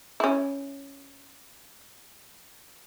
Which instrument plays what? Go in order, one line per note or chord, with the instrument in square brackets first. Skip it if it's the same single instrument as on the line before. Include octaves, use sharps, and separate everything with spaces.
[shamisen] C#4 E4